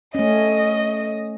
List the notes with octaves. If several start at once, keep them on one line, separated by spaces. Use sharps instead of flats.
A3 C#4 D#5